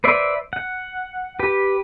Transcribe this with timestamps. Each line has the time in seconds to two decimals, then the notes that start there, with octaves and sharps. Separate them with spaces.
0.04 B4 C5 D5 E5
0.53 F#5
1.39 G4 B4